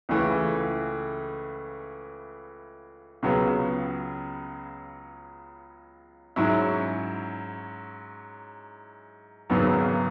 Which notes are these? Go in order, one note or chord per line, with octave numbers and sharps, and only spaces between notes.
C#2 C#3 E3 A3
C#2 C#3 F#3 B3
G#2 F#3 C#4 E4
G#1 F#2 C#3 F#3 B3